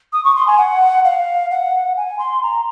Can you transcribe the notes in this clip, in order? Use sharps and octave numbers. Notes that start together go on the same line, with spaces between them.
D#6
C#6
C6
G#5
F#5
F5
F#5
G#5
C6
A#5